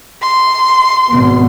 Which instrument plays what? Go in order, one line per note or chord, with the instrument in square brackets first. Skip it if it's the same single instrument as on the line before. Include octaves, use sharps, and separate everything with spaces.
[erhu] C6
[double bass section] G#1 B2 B3